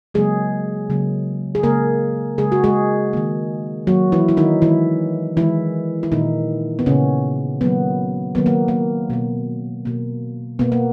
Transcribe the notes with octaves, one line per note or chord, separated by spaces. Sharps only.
C#3 F#3 G#3 A#3 G#4
C#3 F#3 A#3
G#4
C#3 G#3 A#3 A#4
C#3 G#3 G#4
F#4
G#3 G#4
D#3 A#3
D#3 F#3 A#3 F#4
E3 E4
E4
D#3 D#4
D#3 E3 G#3 E4
D#3 E3 G#3 E4
E4
A#2 D#3 A#3 D#4
B3
A#2 C#3 A#3 C#4
D#3 F#3 A#3 B3
D#3 F#3 A#3 B3
A#3
A#3
B2 A#3
B2 A#3
B2 A#3 B3
A#3